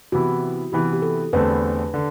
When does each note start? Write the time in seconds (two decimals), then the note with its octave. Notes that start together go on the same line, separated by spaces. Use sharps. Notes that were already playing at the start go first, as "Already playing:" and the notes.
0.12 C3 E3 B3 E4 F#4
0.72 C3 E3 B3 E4 G4
0.93 G4
1.02 A4
1.33 E2 D3 A3 C4 B4
1.94 D3